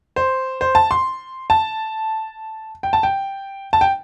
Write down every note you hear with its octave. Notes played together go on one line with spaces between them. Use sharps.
C5
C5
A5
C6
A5
G5
A5
G5
A5
G5